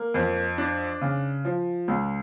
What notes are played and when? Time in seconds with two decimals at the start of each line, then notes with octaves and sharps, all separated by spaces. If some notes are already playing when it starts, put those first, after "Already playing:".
Already playing: A#3
0.14 F2
0.58 D4
1.01 C#3
1.45 F3
1.88 C#2